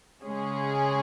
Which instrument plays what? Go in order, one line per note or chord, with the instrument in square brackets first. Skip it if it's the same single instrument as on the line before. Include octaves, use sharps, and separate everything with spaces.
[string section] C#3 G#3 C#4 G#4